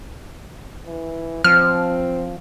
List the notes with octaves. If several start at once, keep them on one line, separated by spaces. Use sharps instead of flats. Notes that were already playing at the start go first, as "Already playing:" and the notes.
E3
F3 C4 F6